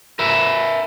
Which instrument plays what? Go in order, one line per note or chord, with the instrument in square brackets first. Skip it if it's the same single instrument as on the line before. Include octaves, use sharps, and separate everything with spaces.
[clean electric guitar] A#4 B4 E5